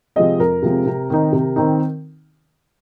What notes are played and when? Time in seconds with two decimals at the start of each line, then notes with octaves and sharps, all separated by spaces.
0.16 C3 F3 G#3 C4 D#5
0.39 F2 A#4
0.62 C3 F3 G#3 C4
0.86 C3
1.10 D#3 C4 D#4
1.32 C3
1.56 D#3 C4 D#4